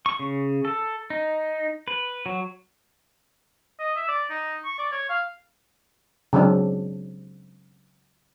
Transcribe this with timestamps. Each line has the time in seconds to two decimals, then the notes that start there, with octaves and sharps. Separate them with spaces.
0.06 C#6
0.19 C#3
0.65 A4
1.10 D#4
1.88 B4
2.26 F#3
3.79 D#5
3.96 E5
4.08 D5
4.30 D#4
4.65 C#6
4.78 D5
4.92 C#5
5.09 F5
6.33 C#3 F#3 C4 D4